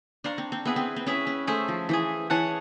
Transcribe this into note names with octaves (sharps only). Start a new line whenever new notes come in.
D4 C5 F5 A#5 C#6
C4
C4
B3 E4 G#4 B4 E5
C4
C4
C#4 E4 G#4 B4 E5
C#4
A3 G#4 C5 E5
F3
E3 G#4 C5 E5
E3 G#4 C#5 F#5 A5